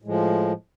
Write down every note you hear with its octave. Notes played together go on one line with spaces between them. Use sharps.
A2 F3 G#3